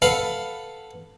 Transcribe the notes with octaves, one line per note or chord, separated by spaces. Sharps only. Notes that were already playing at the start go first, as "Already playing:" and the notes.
A4 B4 F5 F#5